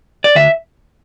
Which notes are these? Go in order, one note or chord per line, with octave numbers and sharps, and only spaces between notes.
D5
D2 E5